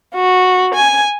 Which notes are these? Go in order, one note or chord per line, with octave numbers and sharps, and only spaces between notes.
F#4
G#5